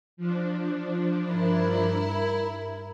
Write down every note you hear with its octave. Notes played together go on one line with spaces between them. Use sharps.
F3 D4
G2 E4 A#4